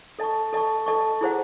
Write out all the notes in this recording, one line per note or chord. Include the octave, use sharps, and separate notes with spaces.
A4 D#5 A5 C#6
A4 D#5 A5 C#6
A4 D#5 A5 C#6
E4 G#4 C5 F#5